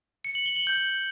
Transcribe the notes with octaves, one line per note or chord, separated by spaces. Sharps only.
C#7
F#7
G7
F#7
G6